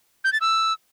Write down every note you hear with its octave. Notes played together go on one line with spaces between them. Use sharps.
G6
A6
E6